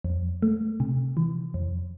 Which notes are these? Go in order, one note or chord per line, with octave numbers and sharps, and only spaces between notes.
F2
A3
C3
E3
F2